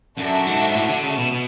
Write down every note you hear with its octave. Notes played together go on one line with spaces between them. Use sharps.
F#2 D4 F#4 A4 E5
G#2
A2
D3
C#3
B2
B2